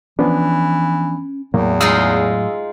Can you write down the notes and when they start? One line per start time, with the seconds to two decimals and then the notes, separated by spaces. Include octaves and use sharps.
0.19 E3 F3 B3 C#4 D4
1.54 E2 A2 F#3 A3 A#3
1.81 G#3 D#4 F4 F5 D#6 E6